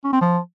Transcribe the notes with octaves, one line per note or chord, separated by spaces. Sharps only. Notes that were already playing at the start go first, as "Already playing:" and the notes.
C#4
C4
F3